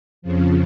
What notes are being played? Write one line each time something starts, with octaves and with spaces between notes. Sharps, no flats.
F2 C#3 F3